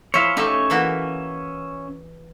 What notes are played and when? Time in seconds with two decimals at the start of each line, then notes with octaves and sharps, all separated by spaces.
0.14 F3 E4 C#5 E5 F5
0.37 A3 C#4 D#4 G4 C#5 E5
0.70 E3 A#3 F#4